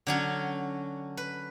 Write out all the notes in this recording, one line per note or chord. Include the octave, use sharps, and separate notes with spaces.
D3 F#3 C#4
B4